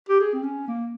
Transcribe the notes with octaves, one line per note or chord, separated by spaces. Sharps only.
G4
G#4
C4
C#4
A#3